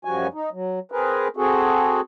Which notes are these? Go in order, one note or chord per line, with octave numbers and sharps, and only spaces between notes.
F#2 F3 G3 F#4 G#5
D#4
F#3
C4 G#4 A#4 B4
C4 F#4 G#4 A4